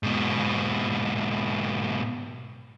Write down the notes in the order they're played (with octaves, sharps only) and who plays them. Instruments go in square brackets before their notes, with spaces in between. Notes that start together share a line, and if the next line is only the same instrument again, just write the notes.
[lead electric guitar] G#2 B2